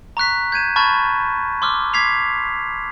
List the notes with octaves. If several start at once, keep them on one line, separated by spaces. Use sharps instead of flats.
A#5 C#6 F#6 B6
G6 G#6 D#7 E7
A5 B5 C#6 F6 G#6 A6
C6 D6 E6 F6
D6 G#6 B6 C7 F7